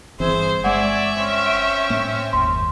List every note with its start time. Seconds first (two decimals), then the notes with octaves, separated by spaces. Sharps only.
0.20 G1 E3 C4 G#4 C5 E5
0.64 G1 G#3 D5 E5 F#5 G#5 C#6 E6
1.15 C4 C#4
1.46 D7
1.90 A2 A#3
2.33 F#1 D#2 G#2 C6